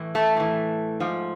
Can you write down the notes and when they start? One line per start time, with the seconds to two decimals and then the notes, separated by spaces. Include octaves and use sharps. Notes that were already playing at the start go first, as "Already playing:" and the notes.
Already playing: A2 E3
0.15 A3
0.36 A2 E3
1.00 G#2 F3